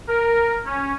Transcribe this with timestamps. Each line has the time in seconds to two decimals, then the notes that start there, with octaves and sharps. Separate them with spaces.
0.08 A#4
0.66 C#4